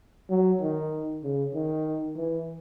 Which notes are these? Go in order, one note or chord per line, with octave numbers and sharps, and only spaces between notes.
F#3
D#3
C#3
D#3
E3